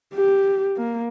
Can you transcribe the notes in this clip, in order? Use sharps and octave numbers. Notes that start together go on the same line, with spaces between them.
G4
A#3